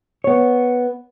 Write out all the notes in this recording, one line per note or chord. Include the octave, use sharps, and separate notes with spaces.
B3 C#5